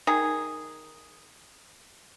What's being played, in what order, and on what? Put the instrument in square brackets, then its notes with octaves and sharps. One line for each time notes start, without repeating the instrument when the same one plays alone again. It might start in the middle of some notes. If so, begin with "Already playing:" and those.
[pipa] D#3 G#4